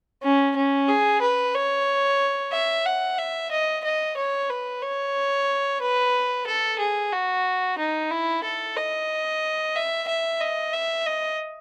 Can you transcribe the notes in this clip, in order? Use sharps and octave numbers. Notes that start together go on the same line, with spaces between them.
C#4
C#4
G#4
B4
C#5
E5
F#5
E5
D#5
D#5
C#5
B4
C#5
B4
A4
G#4
F#4
D#4
E4
A4
D#5
E5
E5
D#5
E5
D#5